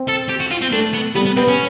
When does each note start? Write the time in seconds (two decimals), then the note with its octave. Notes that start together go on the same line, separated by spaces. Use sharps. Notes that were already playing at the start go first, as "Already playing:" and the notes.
Already playing: C4
0.08 A4
0.29 G4
0.40 F#4
0.51 F4
0.61 C4
0.72 A3 D4
0.93 B3
1.15 G3 B3
1.25 B3
1.36 B3 C4
1.48 C#4